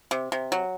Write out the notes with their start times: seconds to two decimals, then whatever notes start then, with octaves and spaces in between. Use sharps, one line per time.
0.11 C3
0.32 C3
0.52 F#3